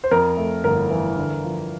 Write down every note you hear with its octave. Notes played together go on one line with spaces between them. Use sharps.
C5
F2 A#4
A3
G1 A#4
E3
D3
F3